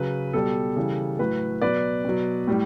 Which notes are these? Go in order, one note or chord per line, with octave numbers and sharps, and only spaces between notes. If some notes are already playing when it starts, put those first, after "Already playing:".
Already playing: C#3 F#3 B4
B2 G3 A4
C#3 E3 G3
A2 F#3 B4
B2 F#3 B4 D5
B2 F#3
A2 G3